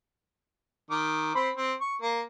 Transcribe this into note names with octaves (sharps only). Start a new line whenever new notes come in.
D#3 D6
C4 C5 B5
C4
C#6
A#3